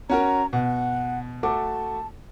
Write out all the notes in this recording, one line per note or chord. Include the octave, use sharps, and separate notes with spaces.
C#4 F#4 A#4 A#5
B2 F#5
A3 F#4 A5 D6